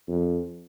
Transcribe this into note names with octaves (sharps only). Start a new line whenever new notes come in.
F2